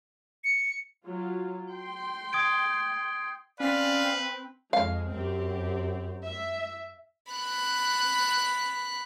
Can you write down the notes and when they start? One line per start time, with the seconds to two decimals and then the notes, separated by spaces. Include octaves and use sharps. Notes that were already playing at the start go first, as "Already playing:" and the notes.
0.44 C#7
1.05 F#3 F4
1.71 G5 C6
2.33 D#6 G#6 D7
3.60 C4 C#4 B4 D5 F5
4.73 F2 G#3 F5
5.12 F#2 C4 G4
6.24 E5
7.32 B5 F#6